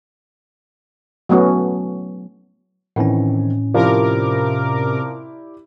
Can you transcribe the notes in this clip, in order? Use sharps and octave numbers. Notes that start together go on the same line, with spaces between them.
F#3 A3 B3 C#4 F#4
A2 D#3 E3 C4 C#4
C3 F3 E4 G4 A#4 D5 D6